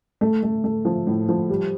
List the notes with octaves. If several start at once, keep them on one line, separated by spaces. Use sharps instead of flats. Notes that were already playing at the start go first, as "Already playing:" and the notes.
A3
A3
A3
F3
A2
F3
G3